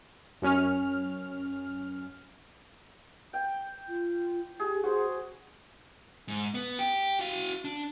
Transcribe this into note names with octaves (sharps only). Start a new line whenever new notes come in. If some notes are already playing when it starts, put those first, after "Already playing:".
F#2 C#4 F6
G5
F4
G4 G#4
F#4 G#4 C5
G#2
B3
G4
F#4 F5
D4